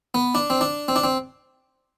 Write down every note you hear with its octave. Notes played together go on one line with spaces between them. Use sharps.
B3
D4
C4
D4
C4
D4
C4